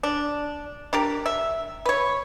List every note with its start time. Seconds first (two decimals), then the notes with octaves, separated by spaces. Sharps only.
0.03 D4
0.93 D4 G4 A#4
1.26 E5
1.86 B4 C#5